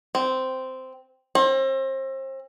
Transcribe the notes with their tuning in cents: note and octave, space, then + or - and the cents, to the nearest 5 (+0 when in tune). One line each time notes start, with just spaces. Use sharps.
C4 -10
C4 +35